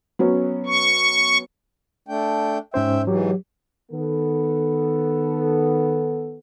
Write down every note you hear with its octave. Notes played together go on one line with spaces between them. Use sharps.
F#3 B3 C#4
C#6
A3 D4 G5
G#2 C#4 C5 E5 G5
G#2 E3 F#3 G4
D#3 B3 A4